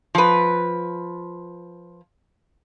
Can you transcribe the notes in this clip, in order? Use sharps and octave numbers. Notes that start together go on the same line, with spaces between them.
F3 B4